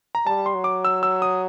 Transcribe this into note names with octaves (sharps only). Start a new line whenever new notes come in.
A#5
G3 A5
C6
F#3
D6
E6
E6
D#6